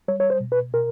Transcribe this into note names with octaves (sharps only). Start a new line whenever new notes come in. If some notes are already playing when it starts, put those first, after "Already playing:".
G3 C#5
C#5
C5
B2
B4
B2 A#4